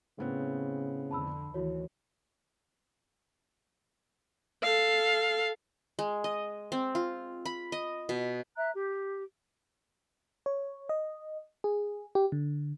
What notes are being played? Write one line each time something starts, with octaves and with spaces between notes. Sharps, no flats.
A2 C#3 B3 C4
F2 D3 A5 B5 E6
D2 D#3 E3 E4 F#4 C#5
A4 F5
G#3
D#5
C4
F4
B5
D#5
B2
E5 A#5 F#6
G4
C#5
D#5
G#4
G4
D3